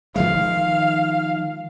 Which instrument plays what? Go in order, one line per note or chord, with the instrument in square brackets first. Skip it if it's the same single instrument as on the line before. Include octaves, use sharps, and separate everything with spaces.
[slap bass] D#3 F3 G#3 [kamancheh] F5